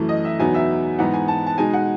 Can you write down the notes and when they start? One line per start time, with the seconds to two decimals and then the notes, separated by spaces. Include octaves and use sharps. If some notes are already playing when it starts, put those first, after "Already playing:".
Already playing: F#2 E3 A3
0.09 D#5
0.25 E5
0.39 E2 B2 F#3 B3 D#4 G#5
0.54 E5
0.99 G#2 E3 B3 D#4 F#5
1.14 G#5
1.28 A5
1.47 A5
1.58 B2 G#3 D#4 G#5
1.74 F#5